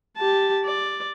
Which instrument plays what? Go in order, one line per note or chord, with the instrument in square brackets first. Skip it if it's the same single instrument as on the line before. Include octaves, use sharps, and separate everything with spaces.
[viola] G4 A5
D5